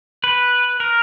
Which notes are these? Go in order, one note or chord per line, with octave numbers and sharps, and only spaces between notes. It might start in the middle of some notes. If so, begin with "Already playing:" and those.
B4
A#4